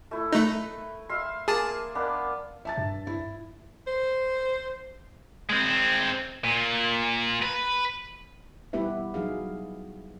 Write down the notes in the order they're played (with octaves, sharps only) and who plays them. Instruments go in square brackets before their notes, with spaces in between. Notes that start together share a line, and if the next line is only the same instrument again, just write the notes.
[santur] A3 E4
[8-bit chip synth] A3 D#4 [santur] B4
[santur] E5 F5 C6
[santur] A#3 [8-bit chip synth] G#4 A5
[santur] A#3 B3 D4
[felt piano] E5 A5 A6
[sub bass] G2
[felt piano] E4
[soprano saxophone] C5
[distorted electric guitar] G#3 C4
A#2
B4
[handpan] G3 B3 E4 G4 B4 E5
F#3 D#4 G#4 F5